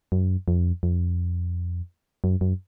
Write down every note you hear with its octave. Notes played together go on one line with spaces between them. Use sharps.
F#2
F2
F2
F#2
F#2